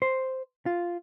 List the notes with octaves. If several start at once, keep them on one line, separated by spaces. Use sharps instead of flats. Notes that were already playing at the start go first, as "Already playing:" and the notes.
C5
F4